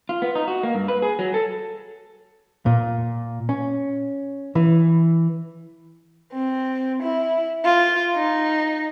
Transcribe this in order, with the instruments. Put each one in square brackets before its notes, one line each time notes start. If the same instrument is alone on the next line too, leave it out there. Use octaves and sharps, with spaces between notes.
[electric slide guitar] F4
B3
D#4
F#4
A#3
G2
B4
G#4
F#3
A4
[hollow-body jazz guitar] A#2
C#4
E3
[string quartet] C4
E4
F4
D#4